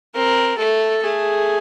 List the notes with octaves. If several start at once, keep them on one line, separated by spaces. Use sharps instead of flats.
C4 A#4
A3 A4
A3 G#4